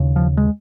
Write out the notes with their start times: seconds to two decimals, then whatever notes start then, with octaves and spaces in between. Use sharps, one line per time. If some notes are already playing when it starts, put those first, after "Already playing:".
Already playing: D#2 C#3
0.16 F3
0.37 G#3